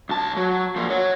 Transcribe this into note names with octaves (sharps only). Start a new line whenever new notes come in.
B1 A5
F#3
F3 A#3
C#5 F#5